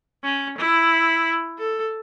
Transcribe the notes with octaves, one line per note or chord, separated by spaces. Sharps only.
C#4
E4
A4